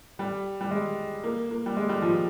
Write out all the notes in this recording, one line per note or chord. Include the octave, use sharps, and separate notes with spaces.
G3
G3
G#3
A#3
A#3
G3
G#3
G3
F3